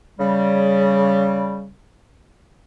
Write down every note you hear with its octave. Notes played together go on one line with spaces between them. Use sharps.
C#3 G3